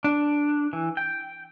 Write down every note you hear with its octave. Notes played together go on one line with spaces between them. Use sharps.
D4
E3
G5